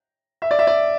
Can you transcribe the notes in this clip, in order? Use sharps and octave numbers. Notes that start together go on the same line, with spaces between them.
E5
D5
E5
D5